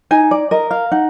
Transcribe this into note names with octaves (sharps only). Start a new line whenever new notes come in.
D#4 G#5
D5
A#4 D#5
F5
D#4 F#5